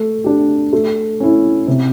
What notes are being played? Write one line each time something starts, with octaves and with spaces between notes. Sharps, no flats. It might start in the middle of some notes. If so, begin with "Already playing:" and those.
Already playing: A3
D4 G4
A3
C#4 E4
C3